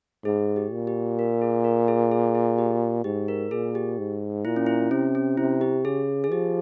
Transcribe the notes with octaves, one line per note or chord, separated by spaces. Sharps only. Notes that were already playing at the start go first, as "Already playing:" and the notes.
G#2 G#4
G4
A#2
G4
A#4
G#4
A#4
G#4
G#4
G#4
G4
G#2 G4
A#4
A#2 G#4
G4
G#2
A#2 E4
C#4
E4
C3 C#4
C#4
C3 E4
G4
C#3 G#4
G#4
F3 G4